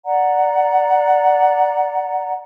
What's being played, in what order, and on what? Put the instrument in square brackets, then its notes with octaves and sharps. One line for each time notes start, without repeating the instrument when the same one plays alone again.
[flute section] D5 F#5 A#5